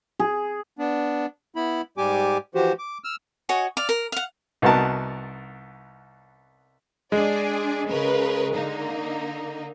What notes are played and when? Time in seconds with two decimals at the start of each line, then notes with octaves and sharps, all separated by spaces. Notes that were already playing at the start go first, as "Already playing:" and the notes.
0.20 G#4
0.79 B3 D4
1.56 B3 E4 B5
1.98 G#2 G3 G4 G#5 D6
2.55 E3 F3 F#4 G4 C5
2.79 D6
3.04 E6 F6
3.49 F#4 C#5 D#5 G#5
3.77 D5 F5
3.89 A#4
4.12 F5 F#5
4.62 C2 B3 D#4 F#4 A#4 A5
7.12 G#3 D4 G#4 D5
7.88 C#3 A#4 B4
8.54 D3 A#3 D#4